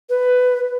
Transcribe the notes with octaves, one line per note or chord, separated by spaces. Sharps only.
B4